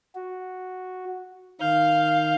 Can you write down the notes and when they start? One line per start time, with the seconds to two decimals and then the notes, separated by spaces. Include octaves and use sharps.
0.15 F#4
1.61 D#3 F5 F6 G6